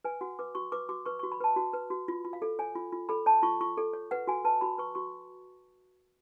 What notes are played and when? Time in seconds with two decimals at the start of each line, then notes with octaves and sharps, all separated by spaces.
0.05 B4 G#5
0.21 F#4 F#5
0.39 B4 D6
0.55 F#4 C#6
0.72 B4 D6
0.89 F#4 D6
1.06 B4 C#6
1.19 C#6
1.23 F#4
1.32 B5
1.40 B4 A5
1.56 F#4
1.73 B4
1.90 F#4
2.08 F4
2.25 F4
2.33 F5
2.42 A4
2.59 C#5 G#5
2.75 F4
2.92 F4
3.09 A4 B5
3.26 C#5 A5
3.43 F4 C#6
3.61 F4 C#6
3.77 A4
3.93 C#5
4.11 B4 F#5
4.27 F#4 G#5
4.45 B4 A5
4.61 F#4 B5
4.78 B4 C#6
4.95 F#4 C#6